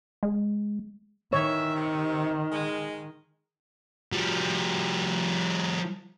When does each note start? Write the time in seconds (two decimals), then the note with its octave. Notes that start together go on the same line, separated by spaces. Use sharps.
0.23 G#3
1.33 D#3 E3 C#5 E5
1.76 C3
2.52 G#3
4.12 F3 G3